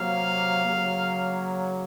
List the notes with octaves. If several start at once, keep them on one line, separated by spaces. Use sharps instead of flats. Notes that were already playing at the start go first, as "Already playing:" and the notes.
Already playing: C3 F#3 A#3 F5
C#3 F#3 A#3